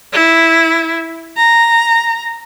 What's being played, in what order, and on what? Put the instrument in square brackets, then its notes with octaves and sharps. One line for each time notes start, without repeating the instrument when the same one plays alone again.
[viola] E4
A#5